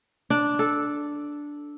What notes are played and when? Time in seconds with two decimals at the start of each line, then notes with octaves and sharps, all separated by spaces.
0.30 D4
0.59 A4